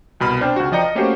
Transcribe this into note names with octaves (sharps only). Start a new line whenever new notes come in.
C2 B2 B5 F6
C4 D4 C5 G5 A5
C#2 F#4
F3 D5 D#5 G5 A#5 C#7
D#5
A3 A#3 C#4 F#4 G4 C5